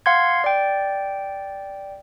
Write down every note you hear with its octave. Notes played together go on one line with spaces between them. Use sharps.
F5 F#5 C6 G#6
D5 G5